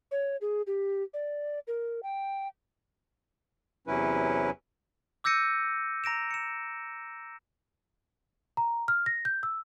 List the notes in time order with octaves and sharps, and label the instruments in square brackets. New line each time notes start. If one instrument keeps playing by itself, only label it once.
[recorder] C#5
G#4
G4
D5
A#4
G5
[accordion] E2 C3 F#3 C#4 E4 B4
[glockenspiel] D6 E6 G6 A#6 C#7 D#7
A#5 A#6 D7 E7
C#7 E7
[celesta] A#5
F6
A#6
G6
E6